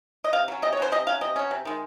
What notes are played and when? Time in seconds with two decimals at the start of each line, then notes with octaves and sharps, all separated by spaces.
0.24 D#5
0.33 C3 F5
0.48 F#3 C#4
0.62 C3 D#5
0.73 C#5
0.77 F#3 C#4 C5
0.92 C3 D#5
1.07 F#3 C#4 F5
1.21 C3 D#5
1.36 F#3 C#4
1.51 C3
1.65 D#3 G#3